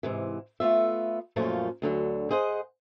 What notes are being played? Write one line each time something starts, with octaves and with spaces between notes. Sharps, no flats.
G#2 C3 E3
A3 B3 F4 E5
F#2 A#2 F3 A3 C#4 F4
D2 D3 F#3
G#4 C5 D#5 F#5